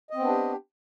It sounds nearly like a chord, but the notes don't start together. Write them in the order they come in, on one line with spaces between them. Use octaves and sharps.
D#5 C4 B3 D4 G4